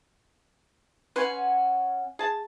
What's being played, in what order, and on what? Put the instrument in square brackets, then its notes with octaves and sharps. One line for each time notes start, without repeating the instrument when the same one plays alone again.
[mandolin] C#4 F#5 G#5 [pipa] B4 C6
[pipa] G#4 A5